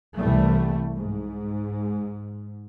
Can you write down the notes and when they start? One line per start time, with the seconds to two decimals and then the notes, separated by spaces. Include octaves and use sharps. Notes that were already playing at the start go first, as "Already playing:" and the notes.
0.17 C2 E3 G3 A3
0.96 G#2